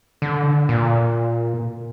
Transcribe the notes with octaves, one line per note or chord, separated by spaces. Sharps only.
D3
A#2